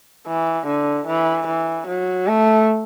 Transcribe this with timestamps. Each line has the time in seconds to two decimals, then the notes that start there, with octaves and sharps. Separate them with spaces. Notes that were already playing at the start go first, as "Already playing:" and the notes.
0.27 E3
0.67 D3
1.07 E3
1.47 E3
1.88 F#3
2.27 A3